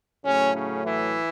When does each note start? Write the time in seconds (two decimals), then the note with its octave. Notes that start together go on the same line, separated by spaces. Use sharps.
0.25 A2 C#3 F#3 A3 C#4
0.54 C#3 C#4
0.85 E3 E4